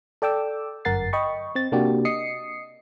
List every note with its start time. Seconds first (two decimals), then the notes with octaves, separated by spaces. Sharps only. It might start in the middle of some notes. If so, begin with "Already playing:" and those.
0.22 A4 D5 G5 D6 E6
0.85 G1 F#2 A#4 F#5 A6 C7
1.13 D#5 G5 B5 C#6
1.55 C4 A6
1.72 C3 A#3 D4 F#4 G4
2.05 D#5 D#6 C7 C#7